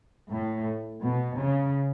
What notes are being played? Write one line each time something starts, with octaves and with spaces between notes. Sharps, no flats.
A2
B2
C#3